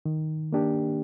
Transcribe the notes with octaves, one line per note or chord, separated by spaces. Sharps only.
D#3
A#3 D4 G4